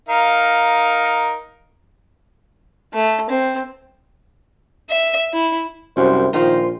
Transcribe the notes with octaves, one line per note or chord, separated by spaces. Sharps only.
D#4 A#4 F5
A3
C4
E5
E4
C2 F#2 C5
A#1 D#3 F4 C5 F5